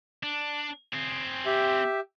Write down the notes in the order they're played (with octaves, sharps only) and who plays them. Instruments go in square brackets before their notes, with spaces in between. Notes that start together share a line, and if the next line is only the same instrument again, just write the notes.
[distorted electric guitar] D4
C4 G#4
[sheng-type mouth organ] G4 E5